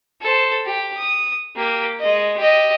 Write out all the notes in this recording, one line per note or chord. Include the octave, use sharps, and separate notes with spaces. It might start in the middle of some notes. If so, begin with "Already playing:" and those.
A4 C5
G4
D#6
A#3 G4
G#3 D#5
G4 D#5